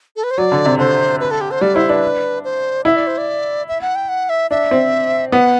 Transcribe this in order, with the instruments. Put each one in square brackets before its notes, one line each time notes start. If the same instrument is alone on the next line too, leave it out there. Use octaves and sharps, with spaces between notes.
[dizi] A4
B4
C5
[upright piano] F#3 [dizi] D5
[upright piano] D3
C3
[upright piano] D3 [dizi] C5
[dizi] B4
A4
G4
C5
[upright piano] G3 [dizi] D5
[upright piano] E4 [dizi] C5
[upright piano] D4 [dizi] B4
[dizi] C5
[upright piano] E4 [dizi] E5
[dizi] D5
C5
D5
E5
F#5
G5
F#5
E5
[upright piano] D4 [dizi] E5
[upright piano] C4
[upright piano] B3 [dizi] F#5